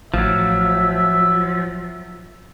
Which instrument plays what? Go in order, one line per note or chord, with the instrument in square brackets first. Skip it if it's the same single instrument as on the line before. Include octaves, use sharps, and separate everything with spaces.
[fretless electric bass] A1 [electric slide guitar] F3 F#3 [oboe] E5